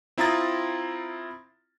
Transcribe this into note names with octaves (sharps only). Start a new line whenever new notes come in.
C4 E4 F4 A#5 D#6 A6